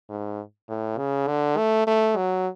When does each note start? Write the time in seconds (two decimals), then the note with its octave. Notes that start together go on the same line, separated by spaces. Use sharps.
0.10 G#2
0.69 A2
0.98 C#3
1.27 D3
1.57 A3
1.87 A3
2.17 F#3